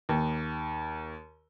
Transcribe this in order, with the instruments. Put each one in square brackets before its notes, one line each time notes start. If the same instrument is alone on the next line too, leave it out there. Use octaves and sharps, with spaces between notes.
[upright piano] D#2